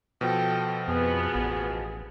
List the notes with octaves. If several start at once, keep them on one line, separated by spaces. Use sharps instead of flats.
B2 F3 A4 G5
F2 B3 G#4
A1